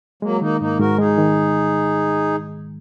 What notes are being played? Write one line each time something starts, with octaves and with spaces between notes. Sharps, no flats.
F#3 G#3 A#3
D#3 A#3 D#4
G#2 A#3 D#4
G#2 F#4 A#4
G#3 D#4 G#4
D#3